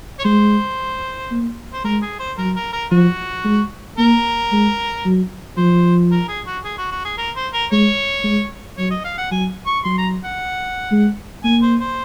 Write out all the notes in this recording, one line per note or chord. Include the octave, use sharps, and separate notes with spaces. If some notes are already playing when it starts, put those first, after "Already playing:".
C#5
G#3 C5
A#3
C5
G#3 A#4
G#4
C5
F#3 A#4
A#4
A#4
F3 F#4
G#3
A#3 A#4
G#3
F#3
F3 C5
A#4
G#4
F#4
G#4
F#4
F#4
G#4
A#4
C5
A#4
G#3 C#5
G#3
F#3 C#5
D#5
F5
F#5
F#3 G#5
C#6
F#3 C6
A#5
F#5
G#3
A#3 G#5
C5
C5